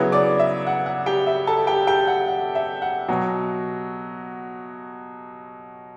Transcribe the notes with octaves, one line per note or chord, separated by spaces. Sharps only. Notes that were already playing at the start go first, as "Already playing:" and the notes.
Already playing: C#3 F#3 B3 E4
D5 D6
E5
F#5
F#5
G4 G5
E5
A4 A5
G4 G5
G4 G5
F#5
F#5
E5
F#5
B2 F#3